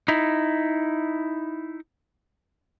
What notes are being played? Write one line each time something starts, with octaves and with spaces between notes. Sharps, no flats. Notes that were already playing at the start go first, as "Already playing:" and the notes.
D#4 E4